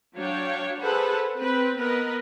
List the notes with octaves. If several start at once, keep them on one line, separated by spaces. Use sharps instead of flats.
F#3 D4 C#5 F5 G5
G#4 A4 B4 C5 F#5
C4 B4
B3 A#4 B4 D#5